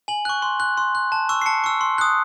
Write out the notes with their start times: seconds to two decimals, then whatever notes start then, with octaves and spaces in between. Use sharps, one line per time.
0.08 G#5 F#7
0.25 C#6 F#6
0.42 C6
0.60 F#6
0.77 C6
0.95 F#6
1.12 A5
1.29 C#6 E6
1.42 C7
1.46 A5 C#7
1.64 C#6 E6
1.81 C6
1.98 D#6 F#6